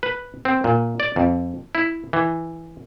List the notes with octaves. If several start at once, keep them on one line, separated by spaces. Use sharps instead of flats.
B4
C4
A#2
D5
F2
E4
E3